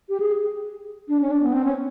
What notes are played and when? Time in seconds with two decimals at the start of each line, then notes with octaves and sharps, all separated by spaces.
0.09 G4
0.20 G#4
1.09 D4
1.21 C#4
1.31 D4
1.43 B3
1.53 C4
1.65 C#4